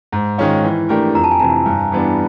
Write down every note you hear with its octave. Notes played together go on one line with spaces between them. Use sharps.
G#2
D#3 G#3 C#4 F4
E3
A3 D4 G4 A#4
F2 A#5
A5
G#5
C3 E3 A5
G2
E3 G3 B3 D4